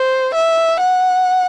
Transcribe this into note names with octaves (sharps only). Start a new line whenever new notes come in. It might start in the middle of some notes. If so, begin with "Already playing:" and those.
Already playing: C5
E5
F#5